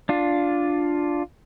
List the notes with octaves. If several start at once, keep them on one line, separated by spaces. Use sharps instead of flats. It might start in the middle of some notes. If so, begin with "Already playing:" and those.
D4 F4